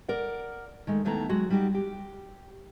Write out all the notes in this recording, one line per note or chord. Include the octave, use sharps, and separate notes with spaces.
A#4 D5 F#5
D#3 G#3 A3
D#2 D#3 A3 B3 E4 A#5
F#3 G#3 F#4
G3 D#4 F#4 G4
G4